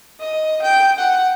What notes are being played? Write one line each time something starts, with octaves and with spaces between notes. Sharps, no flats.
D#5
G5
F#5